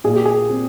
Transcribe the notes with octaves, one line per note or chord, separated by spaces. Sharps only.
A#2 G#4
G4
G#4
C4